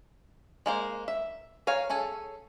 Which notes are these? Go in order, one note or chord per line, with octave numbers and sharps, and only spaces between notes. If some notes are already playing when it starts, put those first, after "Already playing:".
G#3 A#3 C5
E5
C#5 F5 G#5 A#5
C#4 G#4 A4 G#5